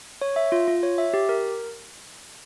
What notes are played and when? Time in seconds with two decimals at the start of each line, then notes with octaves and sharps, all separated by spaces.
0.21 C#5
0.36 E5
0.52 F4
0.68 F4
0.83 C#5
0.98 E5
1.14 G4
1.29 A#4